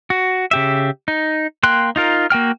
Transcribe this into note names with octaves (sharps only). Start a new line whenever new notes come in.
F#4
C#3 G4 E5
D#4
A#3 G5 C6 F#6
D#4 F4 A#4
A#3 F#4 G5 F6